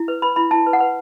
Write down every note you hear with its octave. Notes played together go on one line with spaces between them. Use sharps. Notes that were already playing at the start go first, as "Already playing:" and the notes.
Already playing: E4
B4
B4 B5
E4 B5
E4 A5
B4
F#5
B4